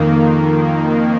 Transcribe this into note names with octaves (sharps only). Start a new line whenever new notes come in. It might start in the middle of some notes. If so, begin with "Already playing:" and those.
Already playing: F2 D#3 A#3